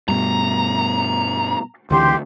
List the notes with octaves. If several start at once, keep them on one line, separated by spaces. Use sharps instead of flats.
G2 B2 A#5
C#2 D3 E3 G4 C6 G6